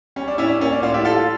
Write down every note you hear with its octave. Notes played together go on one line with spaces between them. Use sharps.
G3 C#4
D4
A2 C#4 E4
D4
A#3 C#4
D4
A2 D4 F4
E4 G4
G3 F4 A4